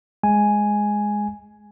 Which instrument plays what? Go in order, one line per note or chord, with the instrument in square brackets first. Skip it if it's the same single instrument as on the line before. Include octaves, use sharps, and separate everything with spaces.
[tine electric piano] G#3 G#5